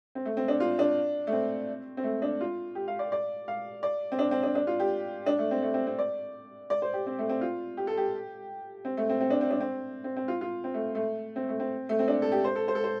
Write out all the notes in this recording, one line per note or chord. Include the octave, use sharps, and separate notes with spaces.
C4
A3
C4
D4
F4
D4
A3
C4
C4
A3
D4
F4
G4
F5
D5
D5
F5
D5
C4
D4
C4
D4
D4
F4
G4
D4
A3
C4
A3
C4
C4
D5
D5
C5
G4
C4
A3
C4
F4
G4
A4
G4
C4
A3
C4
C4
D4
C4
D4
C4
C4
C4
F4
F4
C4
A3
A3
C4
A3
C4
A3
C4
D4
A4
G4
C5
A4
C5
A4
C5